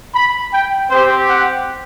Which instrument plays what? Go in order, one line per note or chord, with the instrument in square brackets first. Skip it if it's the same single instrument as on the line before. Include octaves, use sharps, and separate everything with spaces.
[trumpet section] B5
G5
C4 G4 C5
F#5